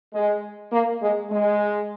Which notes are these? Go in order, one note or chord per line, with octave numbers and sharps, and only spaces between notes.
G#3
A#3
G#3
G#3